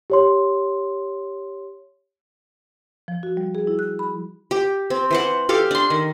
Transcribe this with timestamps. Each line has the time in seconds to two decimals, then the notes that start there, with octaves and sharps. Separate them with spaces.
0.10 G4 C#5 C6
3.08 F3
3.23 F#4
3.37 G3
3.55 G#4
3.67 E4
3.79 F#6
3.99 B5
4.51 G4
4.90 C4
5.11 E3 C5 F#5
5.49 G4 A4 F5
5.71 D4 C6
5.90 D#3